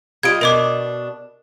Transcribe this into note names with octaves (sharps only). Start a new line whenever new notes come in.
G3 F4 D#5 G#6 D7
B2 D4 A#4 D#5 D6